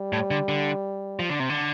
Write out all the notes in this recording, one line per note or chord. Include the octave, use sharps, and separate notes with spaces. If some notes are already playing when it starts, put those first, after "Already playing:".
Already playing: G3
A2
D3
D3
F3
D3
C3
D3